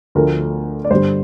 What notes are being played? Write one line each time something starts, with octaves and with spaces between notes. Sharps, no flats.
D2 D3 F3 A3 A#4
D5
G2 D3 G3 C5